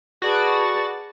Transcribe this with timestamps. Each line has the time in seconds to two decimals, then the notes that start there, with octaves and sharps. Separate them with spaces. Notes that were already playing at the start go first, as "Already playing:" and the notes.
0.22 F#4 G#4 A4 B4 D5 A6